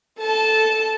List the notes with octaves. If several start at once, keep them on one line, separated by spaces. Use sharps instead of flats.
A4 A5